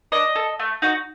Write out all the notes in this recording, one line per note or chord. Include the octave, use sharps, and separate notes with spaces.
D4 D#5
A4
A3
D#4 F#4